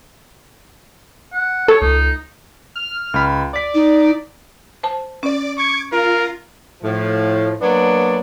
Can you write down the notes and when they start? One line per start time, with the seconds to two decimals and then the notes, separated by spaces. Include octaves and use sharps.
1.33 F#5
1.68 A4 C#5
1.81 C#2 D#4
2.76 F6
3.14 C#2 B5
3.53 D5 D6 B6
3.74 D#4
4.83 C5 A5
5.23 C#4 D5 D6
5.58 C#6 D6 G#6
5.92 F4 A#4
6.83 A2 F3
7.62 F#3 A#3 B3 D4 D5